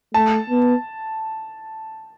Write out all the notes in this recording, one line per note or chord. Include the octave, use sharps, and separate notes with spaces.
A3 A5
B3